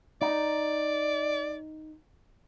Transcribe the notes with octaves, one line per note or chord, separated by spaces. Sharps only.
D#4 D5